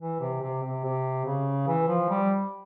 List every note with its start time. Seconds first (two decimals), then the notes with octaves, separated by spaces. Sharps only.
0.01 E3
0.20 C3
0.42 C3
0.63 C3
0.84 C3
1.25 C#3
1.67 E3
1.88 F3
2.09 G3